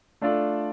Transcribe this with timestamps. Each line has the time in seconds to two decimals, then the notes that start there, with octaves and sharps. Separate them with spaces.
0.21 A3 D4 F4 A4 D5